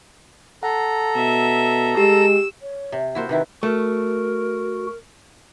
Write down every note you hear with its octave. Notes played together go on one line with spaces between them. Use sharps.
A4 F#5 A#5
B2 E5
G#3 G4 E6
C#5
C3
A#3 E4 F#4 C5
C3 D#3 E4 B4
A3 F#4 A#4